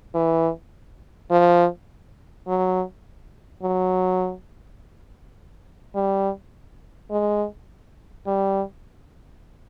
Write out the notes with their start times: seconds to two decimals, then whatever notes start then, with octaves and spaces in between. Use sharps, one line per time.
0.15 E3
1.31 F3
2.47 F#3
3.63 F#3
5.95 G3
7.11 G#3
8.27 G3